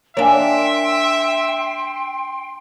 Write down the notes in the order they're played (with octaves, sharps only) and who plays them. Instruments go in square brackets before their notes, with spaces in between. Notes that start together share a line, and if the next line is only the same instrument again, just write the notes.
[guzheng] A#3 D4 [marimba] C#5 F5 G#5 [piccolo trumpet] E5 [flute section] G5 C6